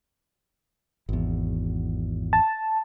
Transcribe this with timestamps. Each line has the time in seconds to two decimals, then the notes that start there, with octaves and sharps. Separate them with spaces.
1.09 G#1 E2
2.33 A5